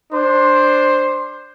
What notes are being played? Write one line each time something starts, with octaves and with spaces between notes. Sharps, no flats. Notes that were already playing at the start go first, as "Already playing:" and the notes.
D4 C5